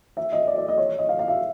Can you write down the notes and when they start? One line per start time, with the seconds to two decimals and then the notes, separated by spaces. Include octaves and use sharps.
0.17 E5
0.32 D#5
0.47 D5
0.58 D5
0.68 D#5
0.78 C#5
0.88 C#5
0.99 D#5
1.09 F5
1.19 F5
1.28 E5